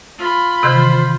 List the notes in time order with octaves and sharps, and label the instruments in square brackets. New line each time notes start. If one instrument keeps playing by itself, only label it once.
[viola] F4 B5
[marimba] C3 D#3 E3 [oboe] C5